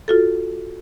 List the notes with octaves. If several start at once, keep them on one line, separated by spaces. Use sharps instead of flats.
F4 F#4 A4